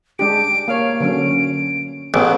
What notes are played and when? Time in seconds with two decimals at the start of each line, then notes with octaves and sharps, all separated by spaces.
0.19 G#3 D4 G4 D7
0.68 A#3 C#5 F5
1.00 D3 F#3 C#4 D7
2.14 A1 E3 B3 G#4 D7